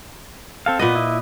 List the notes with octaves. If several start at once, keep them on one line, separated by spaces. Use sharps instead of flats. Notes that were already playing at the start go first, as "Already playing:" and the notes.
C4 A4 F5
A#2 B3 B4 D#5
E4